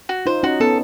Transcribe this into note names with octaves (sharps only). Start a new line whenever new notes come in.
F#4
D#4 F4 C5
C#4 D#4 F#4
B3 C#4 A4